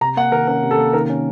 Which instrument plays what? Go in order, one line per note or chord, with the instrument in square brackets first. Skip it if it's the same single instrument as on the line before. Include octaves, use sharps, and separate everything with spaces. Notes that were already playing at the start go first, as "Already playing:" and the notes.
[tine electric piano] C3 [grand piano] A#5
[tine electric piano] A#3 [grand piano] F#5
[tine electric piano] D#3 [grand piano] A#4
[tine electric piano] C#4 [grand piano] A#4
[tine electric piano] C3
[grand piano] A4
[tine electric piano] A#3
[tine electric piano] D#3 [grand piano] A#4
[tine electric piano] C#4